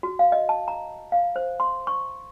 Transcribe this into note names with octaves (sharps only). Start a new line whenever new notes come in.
F#4
F5
D#5
A5
A#5
F5
C5
C6
C#6